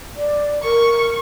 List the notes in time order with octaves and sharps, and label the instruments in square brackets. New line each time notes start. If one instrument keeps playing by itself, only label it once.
[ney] D5
[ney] A#4 [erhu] C#6